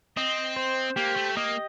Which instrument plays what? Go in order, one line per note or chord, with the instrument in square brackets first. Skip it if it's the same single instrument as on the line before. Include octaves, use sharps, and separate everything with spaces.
[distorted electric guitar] C4 [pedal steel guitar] D#5
[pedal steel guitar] C5
[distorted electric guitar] A#3 [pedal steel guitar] G4
[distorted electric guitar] A3
[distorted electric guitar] A#3 [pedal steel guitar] D#5